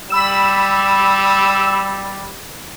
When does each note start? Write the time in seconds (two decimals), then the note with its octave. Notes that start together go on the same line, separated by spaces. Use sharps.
0.10 G3 B5 E6 E7